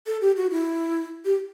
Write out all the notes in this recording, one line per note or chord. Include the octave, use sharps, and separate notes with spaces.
A4
G4
F#4
E4
G4